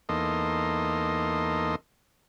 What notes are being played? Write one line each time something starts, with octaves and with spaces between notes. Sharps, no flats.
E2 A#3 D#4 A4 D#5 C6